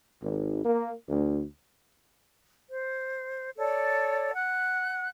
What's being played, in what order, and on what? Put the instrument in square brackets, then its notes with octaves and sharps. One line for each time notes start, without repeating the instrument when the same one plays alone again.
[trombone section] G#1
A#3
D2
[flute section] C5
A4 C#5 D5
F#5 F#6